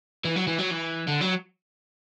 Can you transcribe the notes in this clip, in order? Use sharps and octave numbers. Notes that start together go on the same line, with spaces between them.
E3
F#3
E3
F#3
E3
D3
F#3